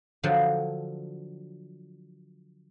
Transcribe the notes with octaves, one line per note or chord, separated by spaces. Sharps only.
D3 F3 F#3